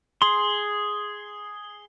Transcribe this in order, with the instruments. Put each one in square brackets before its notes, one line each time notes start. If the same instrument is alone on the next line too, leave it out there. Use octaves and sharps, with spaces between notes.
[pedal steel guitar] G#4 C6